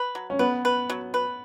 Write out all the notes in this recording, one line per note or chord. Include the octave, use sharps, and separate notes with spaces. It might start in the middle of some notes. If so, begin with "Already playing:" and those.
Already playing: B4
F#3
C#4
B3 B4
B4
F#3
B4